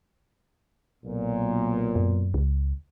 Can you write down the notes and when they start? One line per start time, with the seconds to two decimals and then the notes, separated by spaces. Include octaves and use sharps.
1.04 B1 A#2
1.96 F#2
2.34 C#2